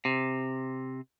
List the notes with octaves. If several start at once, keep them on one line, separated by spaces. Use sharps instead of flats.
C3